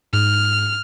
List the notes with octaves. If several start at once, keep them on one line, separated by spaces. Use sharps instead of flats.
G#2 F6